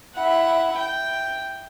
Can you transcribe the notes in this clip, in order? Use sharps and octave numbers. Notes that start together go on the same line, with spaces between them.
E4 F#5
G5